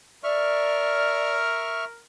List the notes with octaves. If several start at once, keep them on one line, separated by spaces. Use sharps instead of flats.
A#4 D5 E5 C#6 F6